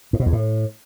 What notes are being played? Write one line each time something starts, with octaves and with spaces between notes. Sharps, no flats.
G#2
B2
E2
A2